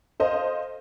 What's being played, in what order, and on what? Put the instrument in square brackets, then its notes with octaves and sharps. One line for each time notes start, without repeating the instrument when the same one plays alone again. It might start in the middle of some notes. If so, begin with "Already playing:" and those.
[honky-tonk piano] A4 C5 D#5 F5